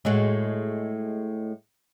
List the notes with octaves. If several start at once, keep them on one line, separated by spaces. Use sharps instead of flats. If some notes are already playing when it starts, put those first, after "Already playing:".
A2 G#3 F#4